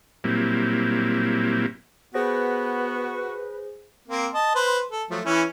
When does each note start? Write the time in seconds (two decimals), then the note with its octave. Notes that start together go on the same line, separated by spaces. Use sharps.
0.24 A#2 F#3 G3 A#3 C4 E4
2.14 B3 F#4 G#4 B4 C5 A#6
4.08 A#3 C4
4.34 D#5 A5
4.55 B4 C5
4.91 A4
5.11 F3 F#3 A3
5.25 E3 C#4 E4